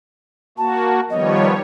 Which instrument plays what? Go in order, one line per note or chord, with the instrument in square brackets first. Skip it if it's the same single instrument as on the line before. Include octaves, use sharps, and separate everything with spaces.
[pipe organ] A#3 F#4 [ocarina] A5
[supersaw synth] D#3 G3 C#5 [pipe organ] F3 B3 [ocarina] D#5